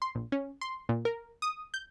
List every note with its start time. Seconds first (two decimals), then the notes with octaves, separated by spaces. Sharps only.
0.02 C6
0.15 A#1
0.32 C#4
0.61 C6
0.89 A#2
1.05 A#4
1.42 D#6
1.74 G6